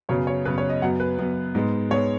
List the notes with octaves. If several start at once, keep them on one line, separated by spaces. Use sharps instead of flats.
F#2 C#3 F#3 B3 C#5
C#5
F#2 C#3 F#3 B3 B4
C#5
D#5
F#2 F#3 B3 F#5
B4
F#2 F#3 B3
G#2 G#3 B3
G#2 G#3 B3 C#5